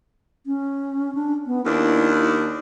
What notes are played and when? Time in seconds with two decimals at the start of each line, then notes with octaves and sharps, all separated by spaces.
0.46 C#4
1.15 D4
1.47 B3
1.66 D#2 D4 E4